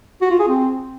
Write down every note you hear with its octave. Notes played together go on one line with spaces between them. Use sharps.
F#4
F4
G#4
C4